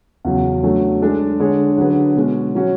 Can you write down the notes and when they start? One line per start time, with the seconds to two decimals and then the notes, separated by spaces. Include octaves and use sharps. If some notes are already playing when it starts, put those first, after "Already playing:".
0.25 E2 C#3 F#3
0.63 F#3 A3 D4
1.02 G#3 D4 A4
1.40 D3 G#3 D4 G#4 C#5
1.78 D3 F#3 C#4 G#4 B4
2.16 B2 G#3 C#4 F#4
2.55 F#3 C#4 F#4